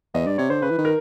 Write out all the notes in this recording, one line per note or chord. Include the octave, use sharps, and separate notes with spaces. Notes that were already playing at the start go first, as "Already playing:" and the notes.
E2 D#5
G2 D5
C3 C#5
D3 C5
C#3 B4
E3
D#3
A#4